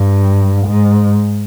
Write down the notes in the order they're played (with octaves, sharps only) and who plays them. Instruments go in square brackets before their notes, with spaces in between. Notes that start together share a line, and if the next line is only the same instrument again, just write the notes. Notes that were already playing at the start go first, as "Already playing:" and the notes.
Already playing: [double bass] G2
G#2